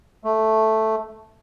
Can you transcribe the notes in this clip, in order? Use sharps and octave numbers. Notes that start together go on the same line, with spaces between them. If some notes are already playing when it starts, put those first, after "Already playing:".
A3